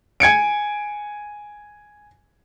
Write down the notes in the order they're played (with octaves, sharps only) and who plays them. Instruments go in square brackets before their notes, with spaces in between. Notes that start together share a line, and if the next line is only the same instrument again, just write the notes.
[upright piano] G#5 G#6 C#7 D7